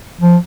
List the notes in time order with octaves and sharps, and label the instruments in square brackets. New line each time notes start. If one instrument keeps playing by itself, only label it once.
[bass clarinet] F3